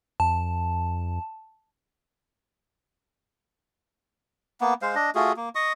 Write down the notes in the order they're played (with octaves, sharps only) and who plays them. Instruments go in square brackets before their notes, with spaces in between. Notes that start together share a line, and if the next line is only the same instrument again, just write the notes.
[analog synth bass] F2 [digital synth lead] A5
[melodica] A#3 B3
G#3 C5 F5
D4 D#5
A3 F4 F#4 G#4
A#3
D#5 C#6 D#6